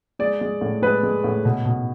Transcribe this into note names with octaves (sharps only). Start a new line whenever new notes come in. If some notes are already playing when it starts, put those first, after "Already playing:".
G#3 D5
G#3
A2
G#3 B4
G#3
A2
B2
B2